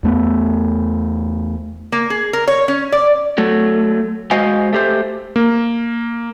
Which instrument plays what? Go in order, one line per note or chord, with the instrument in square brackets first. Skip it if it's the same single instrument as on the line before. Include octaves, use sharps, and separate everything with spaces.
[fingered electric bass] E2 A3 B3
[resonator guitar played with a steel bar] A#3
G#4
A#4
C#5
C#4
D5
[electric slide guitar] F#3 A3
G#3 F#4 C5 D#5 F5 G#5
A3 G4 C5
[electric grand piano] A#3